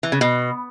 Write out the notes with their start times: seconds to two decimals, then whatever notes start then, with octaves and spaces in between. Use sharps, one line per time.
0.03 E3
0.12 C#3
0.21 B2